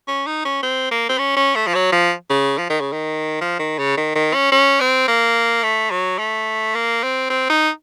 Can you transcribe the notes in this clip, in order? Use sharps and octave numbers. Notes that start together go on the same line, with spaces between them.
C#4
D#4
C#4
C4
A#3
C4
C#4
C#4
A3
F3
F#3
F3
C#3
F3
D#3
C#3
D#3
F3
D#3
C#3
D#3
D#3
C#4
C#4
C4
A#3
A3
F#3
A3
A#3
C4
C4
D#4